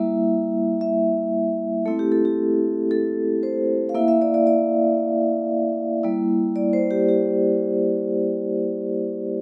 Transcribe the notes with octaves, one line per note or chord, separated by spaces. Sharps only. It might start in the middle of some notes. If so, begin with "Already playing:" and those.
Already playing: G3 A#3 E4 E5
E5
A3 C4 E4 A4
G4
A4
G4
A4
C5
F5
A#3 E4 E5
E5
D5
D5
D5
G3 A#3 E4
D5
C5
G4
G4